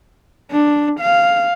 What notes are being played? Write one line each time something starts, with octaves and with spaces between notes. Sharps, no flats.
D4
F5